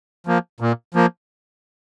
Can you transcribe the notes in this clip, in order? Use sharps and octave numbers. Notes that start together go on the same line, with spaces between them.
F3 A#3
A#2
F3 A#3